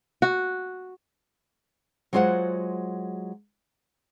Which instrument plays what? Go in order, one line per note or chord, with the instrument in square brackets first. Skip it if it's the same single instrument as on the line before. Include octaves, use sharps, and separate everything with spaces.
[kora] F#4
[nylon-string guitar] F#3 G#3 F4 C5 D5 F#5